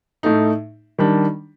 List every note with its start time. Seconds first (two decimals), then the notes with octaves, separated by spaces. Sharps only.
0.23 A2 A3 D#4
0.98 D#3 G3 D4